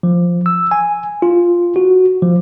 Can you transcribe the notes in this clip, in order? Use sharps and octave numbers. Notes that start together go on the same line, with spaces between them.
F3
E6
G#5
F4
F#4
F3